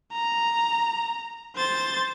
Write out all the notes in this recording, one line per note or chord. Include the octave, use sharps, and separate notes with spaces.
A#5
C5 A6